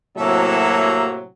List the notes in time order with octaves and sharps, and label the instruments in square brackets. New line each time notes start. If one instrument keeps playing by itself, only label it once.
[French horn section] A2 C3 F#3 [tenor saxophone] A#3 [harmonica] A4 E5